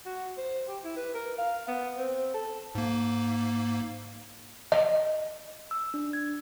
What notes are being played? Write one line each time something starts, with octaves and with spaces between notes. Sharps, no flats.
F#4
C5
G4
E4
B4
A#4
F5
B3
C4
A4
G#2 A#3
D#5
E6
D4
G#6